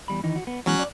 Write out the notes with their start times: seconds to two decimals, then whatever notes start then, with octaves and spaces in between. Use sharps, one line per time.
0.08 E2 G3 B5
0.24 D#3 E3 D#4
0.36 F#4
0.47 B3
0.66 E2 E3 F#3 G#3 C#4 F#6
0.79 D5